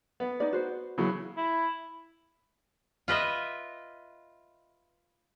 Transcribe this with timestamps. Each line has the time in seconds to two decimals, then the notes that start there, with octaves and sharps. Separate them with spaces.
0.20 B3
0.40 D#4 D5
0.53 F#4 C5
0.98 C#3 E3 F#3
1.37 E4
3.08 F4 B4 D#5 E5